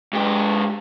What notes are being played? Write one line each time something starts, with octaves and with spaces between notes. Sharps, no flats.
G#2 G4